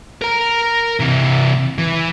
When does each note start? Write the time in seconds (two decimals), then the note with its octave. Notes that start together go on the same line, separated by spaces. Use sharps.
0.22 A#4 A#5
1.00 C3 E3
1.78 E3